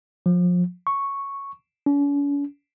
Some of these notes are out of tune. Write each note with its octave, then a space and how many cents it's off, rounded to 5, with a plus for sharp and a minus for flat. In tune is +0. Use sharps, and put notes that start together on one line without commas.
F3 +30
C#6 -5
C#4 +45